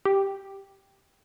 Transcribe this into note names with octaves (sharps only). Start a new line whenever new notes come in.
G4